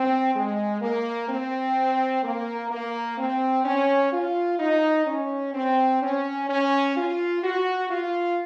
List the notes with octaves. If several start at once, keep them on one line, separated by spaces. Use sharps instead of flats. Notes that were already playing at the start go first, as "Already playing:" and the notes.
Already playing: C4
G#3
A#3
C4
A#3
A#3
C4
C#4
F4
D#4
C#4
C4
C#4
C#4
F4
F#4
F4